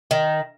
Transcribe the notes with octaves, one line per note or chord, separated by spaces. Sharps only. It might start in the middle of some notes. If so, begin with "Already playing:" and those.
D#3